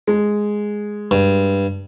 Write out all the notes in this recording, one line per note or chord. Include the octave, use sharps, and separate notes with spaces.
G#3
G2